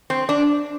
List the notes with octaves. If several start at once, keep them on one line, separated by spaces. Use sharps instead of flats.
C4
D4